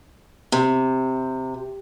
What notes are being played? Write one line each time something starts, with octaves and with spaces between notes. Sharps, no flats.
C3